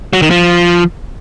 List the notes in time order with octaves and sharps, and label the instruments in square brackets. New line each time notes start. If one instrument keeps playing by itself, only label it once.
[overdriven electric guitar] F#3
D#3
F3